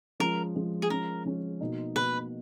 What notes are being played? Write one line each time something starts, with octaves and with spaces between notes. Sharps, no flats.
F3 G#3 C#4 A#4
F3 G#3 C#4
G#4
F3 G#3 C#4 A#4
F3 G#3 C#4
B2 A#3 D#4
B2 A#3 D#4 B4